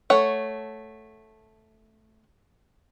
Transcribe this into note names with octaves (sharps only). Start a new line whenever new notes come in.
A3 C#5 F#5